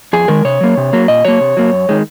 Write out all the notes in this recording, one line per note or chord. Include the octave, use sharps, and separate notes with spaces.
F2 G#4
D#3 G#3 A#4
C3 C#5
F#3 A#3
C3
F#3 A#3
A#2 D#5
F#3 A#3 C#5
C3
F#3 A#3
F#2
D#3 G#3